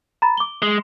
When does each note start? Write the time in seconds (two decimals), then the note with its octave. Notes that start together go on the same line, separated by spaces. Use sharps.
0.22 A#5 B5 A6
0.37 D6 G7
0.62 G#3